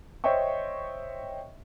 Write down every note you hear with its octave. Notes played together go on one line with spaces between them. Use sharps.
C5 C#5 D#5 E5 G5 C#6